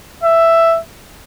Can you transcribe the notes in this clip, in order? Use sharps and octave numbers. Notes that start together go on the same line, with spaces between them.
E5